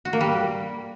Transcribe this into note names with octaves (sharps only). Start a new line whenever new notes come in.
F#4
A#3
G3